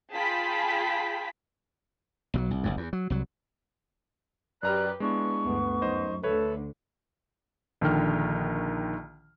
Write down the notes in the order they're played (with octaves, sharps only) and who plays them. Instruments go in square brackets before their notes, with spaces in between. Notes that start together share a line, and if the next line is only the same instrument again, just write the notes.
[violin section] F4 G#4 G5 A5 B5 B6
[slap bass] B1 E3 F#3
C2
F#1 C2 G2
E2
F#3
C2 F#3
[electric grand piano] F#2 A#5 F6 [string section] G4 B4 [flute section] D5 F#6
[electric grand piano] G#3 D4 E4 [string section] B3 [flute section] C#6
[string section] D2 G2 [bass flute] B3
[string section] F#2 [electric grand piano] D#4 C5 D#5
[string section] D2 D3 [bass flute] A4 [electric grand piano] B4 C#5 E5
[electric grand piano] A#1 D3 D#3 G5 F6